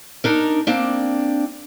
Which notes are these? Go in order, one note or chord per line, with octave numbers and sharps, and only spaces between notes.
D4 D#4 A#4
A#3 C4 D4